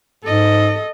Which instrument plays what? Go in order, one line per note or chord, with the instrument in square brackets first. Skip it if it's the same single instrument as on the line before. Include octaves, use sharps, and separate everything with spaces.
[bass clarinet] G#2 [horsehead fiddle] A4 D#5